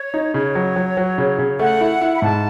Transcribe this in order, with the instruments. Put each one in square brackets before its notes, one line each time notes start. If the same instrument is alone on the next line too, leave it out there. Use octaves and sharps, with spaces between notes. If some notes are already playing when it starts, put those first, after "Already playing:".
Already playing: [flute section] C#5
[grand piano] D#4
[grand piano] C#3 [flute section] C#5
[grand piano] F#3
F#3
F#3
C#3
C#3
[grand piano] A3 [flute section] F#5
[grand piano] E4
E4
[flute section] B5
[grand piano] G#2 [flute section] A5